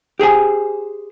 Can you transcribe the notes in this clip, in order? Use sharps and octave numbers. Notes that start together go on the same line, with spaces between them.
G4 G#4 C5 G#5